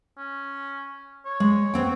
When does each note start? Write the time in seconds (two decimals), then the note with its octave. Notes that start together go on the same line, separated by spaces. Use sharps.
0.17 C#4
1.25 C#5
1.40 G#3
1.74 B3 C4 G5